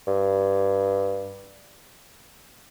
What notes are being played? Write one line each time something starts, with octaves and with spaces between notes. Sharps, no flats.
G2